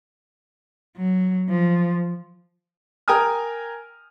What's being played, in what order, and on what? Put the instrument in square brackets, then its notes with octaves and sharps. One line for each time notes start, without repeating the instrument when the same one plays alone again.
[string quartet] F#3
F3
[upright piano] A#4 G5 G#5 D#6 F6